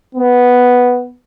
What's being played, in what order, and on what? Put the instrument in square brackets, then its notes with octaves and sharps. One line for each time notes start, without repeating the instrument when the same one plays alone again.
[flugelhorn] B3